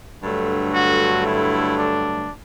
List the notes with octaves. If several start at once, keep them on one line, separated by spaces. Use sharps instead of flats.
G2 D3 F#3 A3
F#4
E4
D4